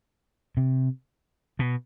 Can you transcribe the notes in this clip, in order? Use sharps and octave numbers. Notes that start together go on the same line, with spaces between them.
C3
B2